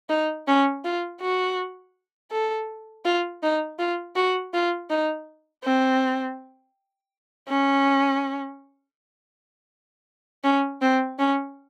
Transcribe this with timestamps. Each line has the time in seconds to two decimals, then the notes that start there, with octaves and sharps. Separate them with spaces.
0.09 D#4
0.47 C#4
0.84 F4
1.21 F#4
2.31 A4
3.05 F4
3.43 D#4
3.79 F4
4.16 F#4
4.54 F4
4.90 D#4
5.64 C4
7.48 C#4
10.44 C#4
10.82 C4
11.19 C#4